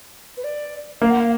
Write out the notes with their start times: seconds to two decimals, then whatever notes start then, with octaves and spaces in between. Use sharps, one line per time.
0.37 B4
0.44 D5
1.02 A#3 F5
1.11 F#5
1.20 F5